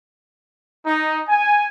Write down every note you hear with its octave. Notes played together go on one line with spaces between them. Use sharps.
D#4
G#5